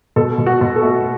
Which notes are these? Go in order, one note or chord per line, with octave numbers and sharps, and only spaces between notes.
B2 A4
B2
F#4
B2
A4
A3